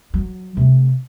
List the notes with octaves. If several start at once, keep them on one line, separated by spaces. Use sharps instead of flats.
F#3
C3 A3